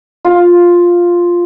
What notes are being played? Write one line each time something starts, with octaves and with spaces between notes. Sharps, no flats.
F4 F5